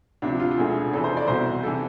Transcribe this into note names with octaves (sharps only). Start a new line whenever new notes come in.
D2 C3 F3 D4
F4
F4
E1 D2 D3 G#4
F1 F2 E3 A4
C5
D5
C2 B2 C5
C3 E3 A4